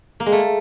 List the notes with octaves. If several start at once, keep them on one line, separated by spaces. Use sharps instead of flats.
A#3
G#3
A3